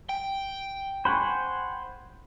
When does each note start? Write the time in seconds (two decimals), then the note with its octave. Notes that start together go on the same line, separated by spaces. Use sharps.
0.09 G5
1.05 C5 F#5 G#5 B5 C#6